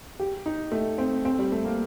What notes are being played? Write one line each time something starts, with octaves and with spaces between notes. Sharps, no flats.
G4
D#4
A3
C4
C4
G3
A3
A#3